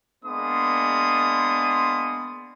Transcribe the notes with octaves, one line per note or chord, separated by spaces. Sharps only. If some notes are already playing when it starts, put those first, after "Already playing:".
G#3 A#3 B3 D4 C6 D#6